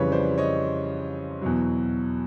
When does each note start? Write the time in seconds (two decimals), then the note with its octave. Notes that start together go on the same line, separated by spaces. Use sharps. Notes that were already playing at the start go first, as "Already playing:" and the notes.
Already playing: F2 C#3 E3 G3 B4 C#5
0.11 C5 D5
0.38 C#5 D#5
1.42 E2 B2 F#3